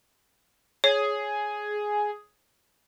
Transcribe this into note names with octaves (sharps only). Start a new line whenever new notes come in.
G#4 C#5